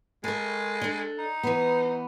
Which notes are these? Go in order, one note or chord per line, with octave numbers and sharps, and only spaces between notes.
G#3 A4 A#4
D4 A4
D#4
E3 B3